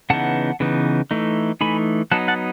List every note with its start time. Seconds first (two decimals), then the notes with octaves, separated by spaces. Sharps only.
0.10 C#3 E3 B3 D#4 F#5 A5
0.60 C#3 E3 B3 D#4
1.11 E3 A3 D#4
1.61 E3 A3 D#4 G#5 B5
2.11 F#3 B3 D#4 F#5 A5
2.28 F#5 A5